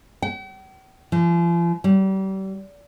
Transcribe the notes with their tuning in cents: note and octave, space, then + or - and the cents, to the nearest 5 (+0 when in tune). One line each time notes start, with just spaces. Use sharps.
G5 -45
F3 -40
G3 -35